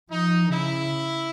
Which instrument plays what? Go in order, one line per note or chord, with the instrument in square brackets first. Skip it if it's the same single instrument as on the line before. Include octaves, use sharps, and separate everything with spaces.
[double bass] F3 [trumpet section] D#4
[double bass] C#3 [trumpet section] E4